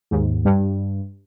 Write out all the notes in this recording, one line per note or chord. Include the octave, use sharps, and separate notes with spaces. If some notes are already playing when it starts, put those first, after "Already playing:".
D#2 G#2
G2